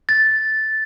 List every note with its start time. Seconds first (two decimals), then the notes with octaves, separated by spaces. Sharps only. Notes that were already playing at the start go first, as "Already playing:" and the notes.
0.09 A6